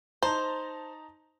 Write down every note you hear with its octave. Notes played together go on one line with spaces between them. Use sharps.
D#4 C5 A5 A#5